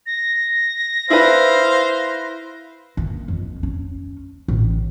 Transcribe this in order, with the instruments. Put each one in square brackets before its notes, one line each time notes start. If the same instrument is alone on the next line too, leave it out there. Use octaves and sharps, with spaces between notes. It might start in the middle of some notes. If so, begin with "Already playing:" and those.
[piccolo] A#6
[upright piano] E4 B4 [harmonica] C5 F5
[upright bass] A#3
F2
C#4
A1